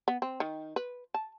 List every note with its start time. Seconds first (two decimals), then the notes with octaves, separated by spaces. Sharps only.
0.08 B3
0.22 C4
0.40 D#3
0.76 B4
1.14 A5